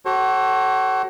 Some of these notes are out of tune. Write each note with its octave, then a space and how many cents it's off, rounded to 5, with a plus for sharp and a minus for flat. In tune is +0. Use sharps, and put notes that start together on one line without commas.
F#4 +35 A4 +0 C#5 -45